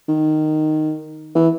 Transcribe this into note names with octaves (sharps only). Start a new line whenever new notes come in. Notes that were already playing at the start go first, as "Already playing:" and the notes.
D#3
E3